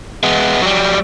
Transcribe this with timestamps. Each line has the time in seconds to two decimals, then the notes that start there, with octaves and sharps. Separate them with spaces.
0.23 G#3 B3
0.62 F#3 G3